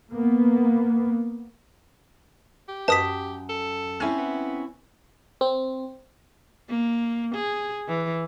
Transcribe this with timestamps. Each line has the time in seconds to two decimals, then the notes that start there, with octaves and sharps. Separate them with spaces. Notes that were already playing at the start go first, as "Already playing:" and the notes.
0.10 A#3 B3
2.69 G4
2.88 F#2 A#4 B4 D#5 A5 D#6 B6
3.49 A4
4.00 C4 C#4 E4 F6 G#6 D#7
4.18 B3
5.41 C4
6.69 A#3
7.36 G#4
7.89 E3